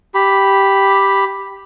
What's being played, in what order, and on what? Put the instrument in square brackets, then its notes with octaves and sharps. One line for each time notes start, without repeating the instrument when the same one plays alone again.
[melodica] G4 B5